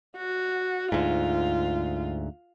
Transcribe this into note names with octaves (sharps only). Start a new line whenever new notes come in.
F#4
D2 G#2 F4